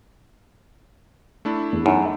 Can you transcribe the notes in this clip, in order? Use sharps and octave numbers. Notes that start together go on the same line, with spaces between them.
A3 D4 E4
E2
F#2 D#4